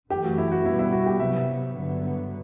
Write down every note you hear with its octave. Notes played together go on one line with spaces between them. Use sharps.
F#2 E3 A3 G4
F#4
E4
F#4
B2 G3 B3 E4
E4
F#4
G4
C3 F#3 B3 E5
G2 D3 F#3 B3